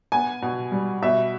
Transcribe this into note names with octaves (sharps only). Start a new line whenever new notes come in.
B3 G#5
B2
G3
B2 E5